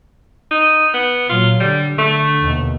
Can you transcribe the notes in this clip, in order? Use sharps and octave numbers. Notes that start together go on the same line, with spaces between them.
D#4
B3
A#2 F#3 F4
D3 G3
D3 A3
D#2 B2